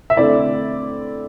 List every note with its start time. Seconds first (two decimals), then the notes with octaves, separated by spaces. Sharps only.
0.10 E5
0.17 D3 A3 C4 E4 D5